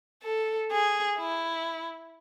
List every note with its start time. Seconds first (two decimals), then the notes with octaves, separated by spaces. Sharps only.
0.23 A4
0.71 G#4
1.19 E4